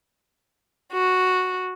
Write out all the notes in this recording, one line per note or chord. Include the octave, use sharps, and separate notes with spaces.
F#4